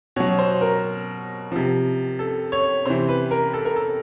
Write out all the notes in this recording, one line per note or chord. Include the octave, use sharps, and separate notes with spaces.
B2 F#3 C#5
C5
A#4
C3 F3
A4
C#5
C3 E3 C5
B4
A#4
A4
A#4
A4